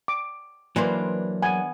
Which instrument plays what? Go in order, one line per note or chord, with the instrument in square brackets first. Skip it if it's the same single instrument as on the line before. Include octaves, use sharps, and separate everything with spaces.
[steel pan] D6
[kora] E3 [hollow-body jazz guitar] F#3 A#3 [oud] D4 B4 C5
[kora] B3 [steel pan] G#5